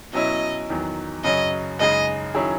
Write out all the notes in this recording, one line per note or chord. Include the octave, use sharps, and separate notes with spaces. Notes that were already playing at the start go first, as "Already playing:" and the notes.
B2 F#3 C#4 E4 D#5
E2 D#3 F#3
F#2 C#3 F#3 C#4 D#5
F#2 C#3 G#3 D#4 G#4 D#5
D#3 F#3 C#4 E4 G#4